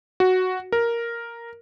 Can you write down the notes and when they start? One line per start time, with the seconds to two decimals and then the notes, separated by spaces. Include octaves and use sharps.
0.20 F#4
0.72 A#4